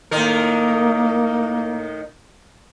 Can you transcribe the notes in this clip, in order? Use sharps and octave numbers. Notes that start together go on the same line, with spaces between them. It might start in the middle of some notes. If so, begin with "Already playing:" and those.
A2 D#3 A#3 A#4